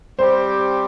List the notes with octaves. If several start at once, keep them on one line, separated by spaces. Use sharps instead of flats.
G3 C4 G4 C5